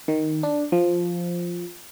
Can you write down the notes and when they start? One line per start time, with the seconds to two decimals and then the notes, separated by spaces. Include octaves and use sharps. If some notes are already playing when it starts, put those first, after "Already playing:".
0.08 D#3
0.43 D4
0.72 F3